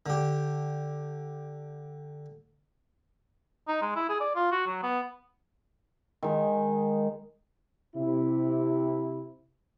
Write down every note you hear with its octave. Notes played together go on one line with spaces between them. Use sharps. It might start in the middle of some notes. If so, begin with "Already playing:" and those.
D3 G4
D#4
G#3
E4
G#4
D5
F4
F#4
F#3
B3
D#3 G#3
C3 E4